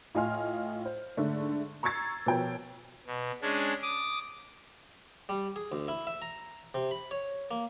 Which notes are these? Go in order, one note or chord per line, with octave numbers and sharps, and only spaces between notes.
A2 F4 D#5 G#5 C6 F6
C5
G#2 D3 A3
A#5 C#6 E6 G#6 A6 C7
B2 F3 A#4 C#5 G5
B2
G#3 C#4 D4
D6 D#6
G3
G#4
D2
E4
E5
A#5
C3
B5
C#5
A#3